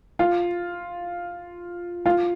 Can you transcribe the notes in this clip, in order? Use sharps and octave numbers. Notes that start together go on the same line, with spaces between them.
F4
F4